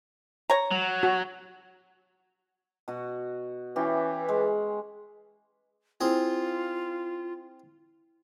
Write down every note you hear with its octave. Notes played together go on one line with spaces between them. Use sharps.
C#5 A#5
F#3
F#4
B2 F#4
E3 C#4 G4 G5
G#3
C4 E4 F4 G#4